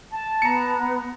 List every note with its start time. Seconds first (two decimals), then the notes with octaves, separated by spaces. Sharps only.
0.12 A5
0.42 B3 A#5 C#7